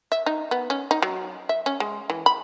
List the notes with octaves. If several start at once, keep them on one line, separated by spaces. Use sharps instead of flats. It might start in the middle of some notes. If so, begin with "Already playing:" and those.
E5
D#4
B3
C#4
D#4
F#3
E5
C#4
G#3
E3
B5